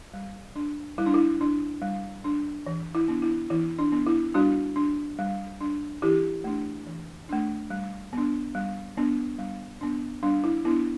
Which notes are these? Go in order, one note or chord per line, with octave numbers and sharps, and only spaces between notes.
G3
D4
G3 E4
D4
E4
D4
G3
D4
E3
E4
B3 D4
E4
E3 E4
D4
B3 D4
E4
G3 D4 F#4
D4
G3
D4
E3 E4 G4
A3 D4
E3
A3 D4
G3
B3 D4
G3
B3 D4
G3
B3 D4
G3 D4
E4
B3 D4 E4